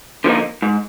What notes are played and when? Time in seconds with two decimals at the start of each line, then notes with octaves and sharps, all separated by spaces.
0.24 D3 F3 A#3 D#4
0.62 G#2